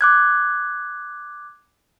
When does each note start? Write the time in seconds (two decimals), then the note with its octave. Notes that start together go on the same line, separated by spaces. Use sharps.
0.01 D6 F#6 G#6